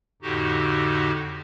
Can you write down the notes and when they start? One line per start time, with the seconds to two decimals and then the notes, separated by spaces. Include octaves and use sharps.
0.22 F2 A2 D3 D#4 F#4 G4